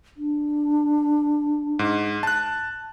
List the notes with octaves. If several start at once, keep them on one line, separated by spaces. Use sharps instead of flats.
D4
G#2
A5 F#6